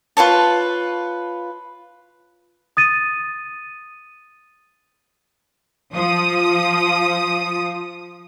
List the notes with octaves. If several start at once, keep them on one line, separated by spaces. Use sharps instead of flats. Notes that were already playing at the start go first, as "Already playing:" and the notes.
F4 B4 C#5 A5
D#6 A6 D#7
F3 D#6